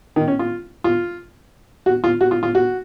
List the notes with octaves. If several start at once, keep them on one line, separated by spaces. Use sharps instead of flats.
D#3
C#4
F4
F4
F#4
F4
F#4
F4
F4
F#4